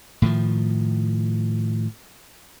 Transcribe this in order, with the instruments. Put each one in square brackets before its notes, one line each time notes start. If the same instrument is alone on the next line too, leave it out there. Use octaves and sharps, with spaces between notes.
[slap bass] A2 D#3 F3